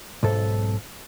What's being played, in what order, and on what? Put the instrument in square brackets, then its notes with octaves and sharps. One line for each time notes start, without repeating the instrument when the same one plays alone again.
[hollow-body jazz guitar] B1 G#2 A4